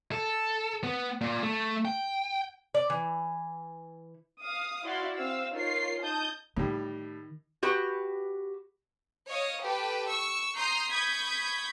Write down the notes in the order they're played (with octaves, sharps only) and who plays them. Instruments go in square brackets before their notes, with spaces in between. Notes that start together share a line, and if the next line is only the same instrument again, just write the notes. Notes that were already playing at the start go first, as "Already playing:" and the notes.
[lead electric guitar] A4
B3
A#2
A3
G5
[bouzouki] D5
E3
[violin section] F5 D#6
E4 F#4 D5 F5 C6
C4 F5 E6
D#4 F4 A#4 C#5 C7
D#4 A5 D#6 G6
[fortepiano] A2 G3 [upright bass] D#3
[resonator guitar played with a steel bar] F#4 G4 B4
[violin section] C#5 D#5 F5 D#6
G4 A4 B4 G5
C#6 E6
A#5 C6 D#6 G6 C7
B5 C#6 D#6 G6 G#6 B6